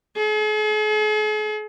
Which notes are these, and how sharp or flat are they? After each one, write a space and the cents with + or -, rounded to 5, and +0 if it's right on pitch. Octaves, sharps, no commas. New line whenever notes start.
G#4 +45